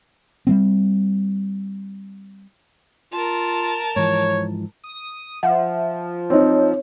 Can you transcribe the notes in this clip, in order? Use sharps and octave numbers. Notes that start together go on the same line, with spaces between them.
G3 G#3 C4
F4 A#4 A5
G#2 E3 F3 C#5
D#6
F3 E5 F#5
C4 D#4 C#5